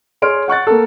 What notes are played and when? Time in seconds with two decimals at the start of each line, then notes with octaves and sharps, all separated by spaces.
0.22 G#4 C#5 C6 F6 D7
0.48 F#5 C#6 F#6 A6
0.67 A#3 A4